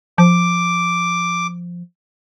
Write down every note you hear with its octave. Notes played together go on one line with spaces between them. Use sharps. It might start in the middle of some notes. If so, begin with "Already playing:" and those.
F3 D6